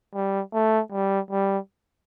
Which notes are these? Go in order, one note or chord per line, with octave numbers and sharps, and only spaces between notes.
G3
A3
G3
G3